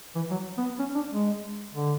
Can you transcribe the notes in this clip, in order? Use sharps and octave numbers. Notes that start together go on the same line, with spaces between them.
E3
F#3
B3
C#4
D4
G#3
D3